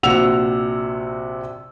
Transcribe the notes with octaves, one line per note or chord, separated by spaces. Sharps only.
A#1 C3 F#4 F#5 E6 F7